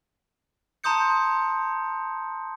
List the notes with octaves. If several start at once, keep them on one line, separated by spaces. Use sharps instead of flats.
A5 A#5 C6 D#6 G6 C#7